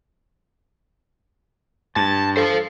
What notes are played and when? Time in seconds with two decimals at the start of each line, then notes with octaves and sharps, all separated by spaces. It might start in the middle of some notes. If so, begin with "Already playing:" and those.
1.96 G2 A5
2.37 A4 C5 F5